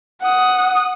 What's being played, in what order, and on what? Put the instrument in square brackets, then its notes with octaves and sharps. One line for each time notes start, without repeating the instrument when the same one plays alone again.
[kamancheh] F#5 D#6